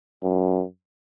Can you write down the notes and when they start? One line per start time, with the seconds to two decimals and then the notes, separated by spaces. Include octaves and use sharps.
0.23 F#2